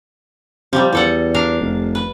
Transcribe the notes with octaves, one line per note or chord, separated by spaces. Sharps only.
C3 F3 G3
E2 G3 A4 F#5
D4 A#4 F5
F1
B4